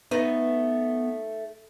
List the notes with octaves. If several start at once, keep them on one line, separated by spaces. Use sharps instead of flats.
A3 B3 D#4 B4